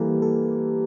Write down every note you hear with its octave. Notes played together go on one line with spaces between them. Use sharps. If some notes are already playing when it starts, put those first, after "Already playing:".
Already playing: E3 G3 A#3 G4 A4
A4